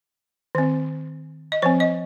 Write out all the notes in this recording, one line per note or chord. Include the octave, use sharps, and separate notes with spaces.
D#3 C4
D#5
F3 C4 C5
D#5